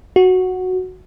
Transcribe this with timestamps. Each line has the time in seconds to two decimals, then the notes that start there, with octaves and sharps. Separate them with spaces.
0.16 F#4